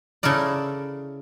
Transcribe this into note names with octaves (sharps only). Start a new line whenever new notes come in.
C#3 E4 A4 A#4 D5